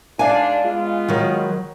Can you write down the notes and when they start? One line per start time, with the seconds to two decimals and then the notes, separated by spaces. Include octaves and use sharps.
0.19 G#2 D4 F5 G#5
0.63 G#3 B3 F4
1.08 D#3 F#3